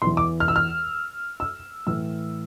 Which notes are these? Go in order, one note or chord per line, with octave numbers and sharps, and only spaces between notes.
E2 E3 C6
D6
F6
E6
F6
E6
A2 E3 E6